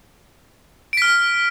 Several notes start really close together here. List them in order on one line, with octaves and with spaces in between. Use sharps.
D7 B6 F6